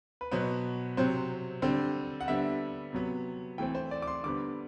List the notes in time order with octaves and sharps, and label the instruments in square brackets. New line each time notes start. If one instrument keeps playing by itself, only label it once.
[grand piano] B4
B2 F#3 B3 C5
C3 F#3 C4 C5
D3 G3 C4 C5
F#5
D3 G3 B3 E5
C3 F#3 B3
E3 A3 C4 G5
C5
D5
D6
C6
D3 G3 B3 D6